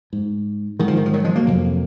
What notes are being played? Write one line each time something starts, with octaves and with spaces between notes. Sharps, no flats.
G#2
G#2 D#3
F3
D#3
F3
D#3 F#3
F3 G#3
F#3 A#3
F2 C3